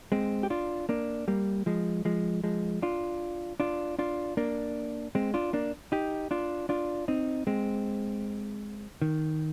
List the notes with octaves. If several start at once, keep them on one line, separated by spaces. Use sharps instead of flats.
G#3 C4
G4
D4 F4
A#3 D4
G3 A#3
F3 G#3
F3 G#3
F3 G#3
D4 F4
D4 F4
D4 F4
A#3 D4
G#3 C4
D4 F4
A#3 D4
D#4 G4
D4 F4
D4 F4
C4 D#4
G#3 C4
D#3